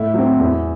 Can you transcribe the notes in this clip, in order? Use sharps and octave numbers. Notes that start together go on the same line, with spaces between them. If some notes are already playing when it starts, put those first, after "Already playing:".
Already playing: A2 E4
F#3 C4
E2